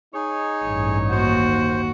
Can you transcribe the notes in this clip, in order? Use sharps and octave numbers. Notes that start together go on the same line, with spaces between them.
D#4 G#4 C#5
A1 G2
D#2 F#4 C5